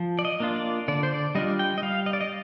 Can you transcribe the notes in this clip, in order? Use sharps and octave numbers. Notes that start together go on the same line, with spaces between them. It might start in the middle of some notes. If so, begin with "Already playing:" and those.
Already playing: F3
D5
D#5
A#3 D4 F4
D5
D3 D5
C5
D5
G3 D4 F4 D#5
G5
D#5
G3 F5
D#5
D5
D#5